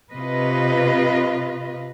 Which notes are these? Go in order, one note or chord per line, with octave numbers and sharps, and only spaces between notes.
C3 F4 B4 D#5